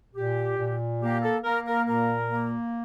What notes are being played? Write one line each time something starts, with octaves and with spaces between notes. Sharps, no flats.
A#2 G4
A#2
A#3 G4
A4
A#3 A#4
A#4
A#2 A#4
A#3